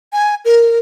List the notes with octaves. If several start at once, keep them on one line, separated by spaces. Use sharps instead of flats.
G#5
A#4